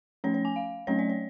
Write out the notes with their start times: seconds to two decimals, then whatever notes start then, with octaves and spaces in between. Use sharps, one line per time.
0.24 F3 A3 C#4 C#5
0.34 C#5
0.45 G#5
0.56 F5
0.87 F#3 A3 C#4 C#5
0.99 D5
1.09 C#5